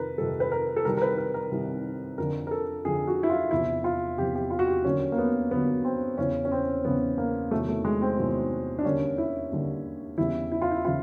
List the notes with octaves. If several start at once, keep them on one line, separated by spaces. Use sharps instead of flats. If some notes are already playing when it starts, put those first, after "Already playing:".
Already playing: F2 C3 D#3 A#4 B4
F2 C3 D#3 G3 A4
B4
A#4
A4
C2 C3 D#3 G3 A#4
A#4
B4
A#4
A#4
C2 C3 D#3 G3
F2 D3 F3 A#4
A#4
A4
F2 D3 F3 G#4
F#4
E4
F4
E2 C3 F3 E4
F4
E2 C3 F3 G4
G4
F4
F#4
G4
D#2 D3 F#3 C#4
A#3
B3
D#2 D3 F#3 B3
C4
E2 C#3 E3 C#4
C#4
C4
E2 C#3 E3 B3
A#3
E2 C3 D#3 F#3 A3
A3
G#3
C4
E2 C3 D#3 F#3
D4
D#2 D3 G3 C#4
E4
D#2 D3 G3
E2 C#3 E3 G3 E4
E4
F4
E4
C#3 E3 F4